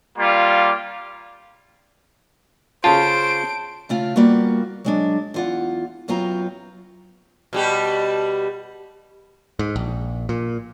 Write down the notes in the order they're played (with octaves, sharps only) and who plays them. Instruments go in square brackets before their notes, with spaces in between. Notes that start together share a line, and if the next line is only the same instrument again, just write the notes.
[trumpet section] G3 A#3 F4
[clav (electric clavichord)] C#3 F4 [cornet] C5 [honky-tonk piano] A5 [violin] D7
[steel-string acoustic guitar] C#3 A3 F4 F5
G3 A#3 B3 F4 F#4
F#3 G#3 D4
E2 F4 F#5
F#2 F#3 B3 F4 G5 A#5
[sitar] B2 G3 G4
[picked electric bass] G#2
A#1
A#2